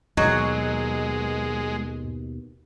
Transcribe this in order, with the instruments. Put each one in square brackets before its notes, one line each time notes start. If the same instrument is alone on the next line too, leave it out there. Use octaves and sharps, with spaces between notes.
[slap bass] D#2 B2 [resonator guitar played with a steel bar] F#3 [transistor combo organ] G#3 [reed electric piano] D#5